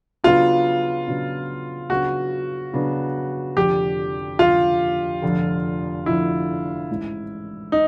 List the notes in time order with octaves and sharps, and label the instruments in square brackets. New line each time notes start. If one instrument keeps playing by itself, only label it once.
[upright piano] C#3 F#3 B3 D4 [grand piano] F4
[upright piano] C#3 F#3 B3 D4
[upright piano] C#3 F#3 B3 D4 [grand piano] F#4
[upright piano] C#3 F#3 B3 D4
[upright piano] F1 F2 D3 [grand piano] G4
[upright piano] F1 F2 D3 [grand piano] F4
[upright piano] F1 F2 D3
[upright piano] F1 F2 D3 [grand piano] E4
[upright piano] A1 G#2 E3
[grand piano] D#4